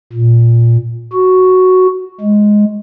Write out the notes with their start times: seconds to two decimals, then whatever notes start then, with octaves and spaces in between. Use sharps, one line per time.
0.13 A#2
1.13 F#4
2.21 G#3